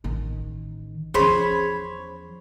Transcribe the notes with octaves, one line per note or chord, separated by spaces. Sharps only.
A1 D#3
E2 F3 C#4 G#4 C5 C#5 B5